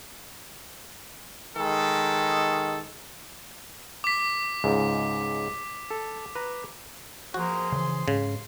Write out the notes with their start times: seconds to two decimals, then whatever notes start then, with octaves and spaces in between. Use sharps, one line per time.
1.57 D#3 G#3 A4
4.04 D6 B6
4.64 C#2 G#2
5.91 A4
6.35 B4 A#5
7.34 F3 A#3 F#4 G#4 A#4 C5
7.72 C#3 E3 C6
8.08 G#2 C#3